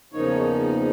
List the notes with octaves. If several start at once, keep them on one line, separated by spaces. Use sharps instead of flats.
E2 C#3 F3 A#3 D#4 C#5